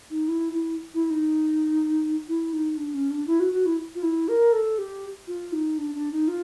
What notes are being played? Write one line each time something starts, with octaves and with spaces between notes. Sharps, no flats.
D#4
E4
E4
E4
D#4
E4
D#4
D4
C#4
D4
E4
F#4
F#4
E4
F4
E4
A#4
A4
G4
F4
D#4
D4
D4
D#4
F4